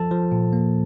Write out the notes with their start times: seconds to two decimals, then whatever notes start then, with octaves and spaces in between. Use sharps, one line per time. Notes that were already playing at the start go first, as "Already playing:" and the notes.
Already playing: F3 A4 A5
0.11 F3
0.32 A#2
0.53 A#3